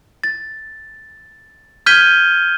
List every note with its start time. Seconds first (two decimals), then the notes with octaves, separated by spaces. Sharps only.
0.24 A6
1.86 F6 G6 G#6 B6 D#7 G7